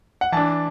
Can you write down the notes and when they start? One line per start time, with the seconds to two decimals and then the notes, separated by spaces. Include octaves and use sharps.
0.21 F#5
0.32 E3 D4 A5